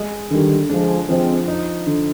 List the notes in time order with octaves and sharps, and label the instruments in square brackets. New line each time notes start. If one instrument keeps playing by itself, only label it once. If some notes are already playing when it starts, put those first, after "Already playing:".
Already playing: [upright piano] G#3
[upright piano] D3 [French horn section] D#3 G3
[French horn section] F3 G#3 [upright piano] D4
[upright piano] F3 [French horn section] G#3 C4
[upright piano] D#4
D3